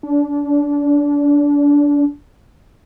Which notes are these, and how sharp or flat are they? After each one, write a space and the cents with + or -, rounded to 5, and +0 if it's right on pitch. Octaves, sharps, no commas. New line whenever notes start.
D4 -25